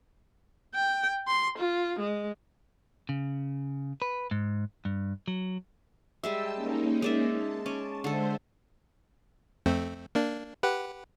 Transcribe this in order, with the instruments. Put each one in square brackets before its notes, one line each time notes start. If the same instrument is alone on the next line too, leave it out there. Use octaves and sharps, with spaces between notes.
[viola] G5
C6
F4
G#3
[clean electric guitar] C#3
B4
G#2
G2
F#3
[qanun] G3 G#3 E5 [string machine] G5 A5 E6
[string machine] A#3 C#4 D#4
[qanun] G#3 D5 E5
[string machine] A5
[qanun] C#4 D6
[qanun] D3 A4 [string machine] G#3 C5 E5
[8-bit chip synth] F2 A3 C4
A#3 D4
G4 B4 F#5